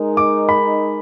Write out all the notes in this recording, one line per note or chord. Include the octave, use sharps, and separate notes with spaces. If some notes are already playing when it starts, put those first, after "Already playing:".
Already playing: G#3 D#4 A#4
D6
B5